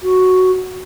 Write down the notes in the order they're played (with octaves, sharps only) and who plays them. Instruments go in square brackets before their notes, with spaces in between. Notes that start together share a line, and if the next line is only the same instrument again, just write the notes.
[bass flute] F#4